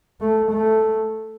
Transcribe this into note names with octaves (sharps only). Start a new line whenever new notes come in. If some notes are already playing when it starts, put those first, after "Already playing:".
A3
A3